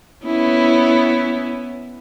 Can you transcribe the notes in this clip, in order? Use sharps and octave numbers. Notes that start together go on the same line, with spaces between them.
B3 C#4 E4